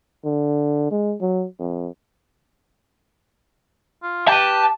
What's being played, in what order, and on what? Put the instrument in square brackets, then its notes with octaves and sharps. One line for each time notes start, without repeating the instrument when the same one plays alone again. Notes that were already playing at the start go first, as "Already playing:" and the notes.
[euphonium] D3
G#3
F#3
F2
[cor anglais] F4
[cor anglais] G4 [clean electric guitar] B4 G5 [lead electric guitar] A5